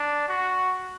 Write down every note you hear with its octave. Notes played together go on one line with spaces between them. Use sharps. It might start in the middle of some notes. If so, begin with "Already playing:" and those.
Already playing: D4
F#4